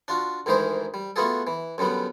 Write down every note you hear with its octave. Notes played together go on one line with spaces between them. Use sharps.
D4 F4 F#4
D2 G#2 D#3 E3 G#4 C5
G3
A3 B3 F4 F#4 G#4 A4
E3
F#2 D3 G3 B3